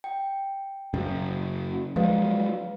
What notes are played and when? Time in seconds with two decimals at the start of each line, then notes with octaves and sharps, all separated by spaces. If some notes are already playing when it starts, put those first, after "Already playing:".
0.04 G5
0.94 F#2 C#3
1.96 F3 F#3 G#3 B4 F5